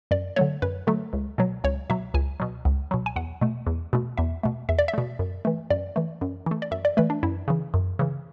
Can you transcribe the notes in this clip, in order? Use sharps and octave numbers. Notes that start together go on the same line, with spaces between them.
F#2 D5
D3 F#3 A3 C#5
F#2 B4
D3 F#3 A3
C#2
B2 F#3
C#2 C#5
B2 F#3 E5
C#2 G#5
B2 F#3
C#2
B2 F#3
G#5
E2 F#5
B2 A3
E2
B2 A3
E2 E5
B2 A3
E2 E5
D5
E5
B2 A3
F#2
E3 A3
F#2 D5
E3 A3
F#2
E3 A3
D5
F#2 E5
D5
E3 A3 B4
D4
F#2 E4
C#3 E3
F#2
C#3 E3